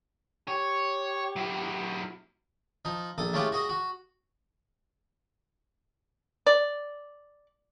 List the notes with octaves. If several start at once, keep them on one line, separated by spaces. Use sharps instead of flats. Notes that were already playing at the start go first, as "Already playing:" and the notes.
G4 C#5
F#3 E4
F3 D#4
A#1 A4 D#6
G#3 A3 C#4 E4 F4 G4
F#4 G#4 D#5
F#4
D5